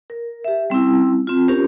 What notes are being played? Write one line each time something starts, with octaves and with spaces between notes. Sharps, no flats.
A#4
G4 E5
G3 C4 C#4 E4
C4 F4
C#4 F4 G4 A#4 C5